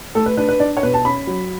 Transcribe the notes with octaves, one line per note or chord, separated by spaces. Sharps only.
A3 A4
B4
D4 B4
B4
D4 D5
C#5
B2 B4
A5
C#4 B5
F#3